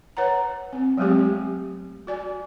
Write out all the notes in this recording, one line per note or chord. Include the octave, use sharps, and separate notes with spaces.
B4 C#5 F#5 A#5
C4
F#3 G#3 A3 B3 C4 G4
F#4 D5 G#5